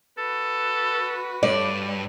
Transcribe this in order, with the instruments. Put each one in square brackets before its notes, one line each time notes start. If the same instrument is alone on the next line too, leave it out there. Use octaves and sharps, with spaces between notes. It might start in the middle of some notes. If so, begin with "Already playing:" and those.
[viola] F#4 B4 [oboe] A4
[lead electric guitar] G2 [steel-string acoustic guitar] D5